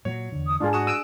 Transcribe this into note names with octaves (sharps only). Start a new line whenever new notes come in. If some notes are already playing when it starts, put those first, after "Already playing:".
A#2 F#3 C#5
E2 D3
D#6
G#2 G#3 D4 F4 G#4
F#4 C#6 D#6 E7
E6 F#6 D7 D#7